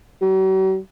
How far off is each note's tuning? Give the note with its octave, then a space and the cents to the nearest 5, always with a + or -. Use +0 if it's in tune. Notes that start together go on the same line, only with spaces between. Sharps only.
F#3 +45